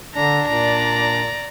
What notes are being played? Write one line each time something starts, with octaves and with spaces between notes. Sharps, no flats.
D3 D4 A#5
A#2 D5 A#5